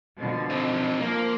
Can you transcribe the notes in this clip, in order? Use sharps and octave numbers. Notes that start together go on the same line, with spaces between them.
B2 D3 F3
C4 D#4
F3 A#3